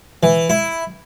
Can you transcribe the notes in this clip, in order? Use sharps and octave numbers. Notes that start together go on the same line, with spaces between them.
E3
E4